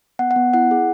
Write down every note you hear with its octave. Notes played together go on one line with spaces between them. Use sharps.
B3 F#5
F#5
B3
E4 F#5
G#4